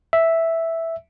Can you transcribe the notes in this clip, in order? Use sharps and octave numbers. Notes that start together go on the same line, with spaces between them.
E5